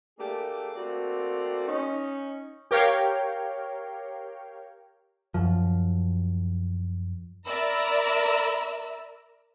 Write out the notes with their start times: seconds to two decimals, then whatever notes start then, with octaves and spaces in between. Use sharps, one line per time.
0.18 A3 A#3 D4 G4 G#4
0.75 A3 A#3 C4 F#4 D5
1.67 C#4 D#4
2.71 G4 A#4 C#5 F5 G5
5.34 F#2 F3
7.47 A#4 D5 E5 A#5 B5 E6